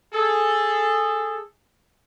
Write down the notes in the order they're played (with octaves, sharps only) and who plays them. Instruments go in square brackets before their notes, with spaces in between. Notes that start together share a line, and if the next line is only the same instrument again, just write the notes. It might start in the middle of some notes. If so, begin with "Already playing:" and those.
[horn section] G#4 A4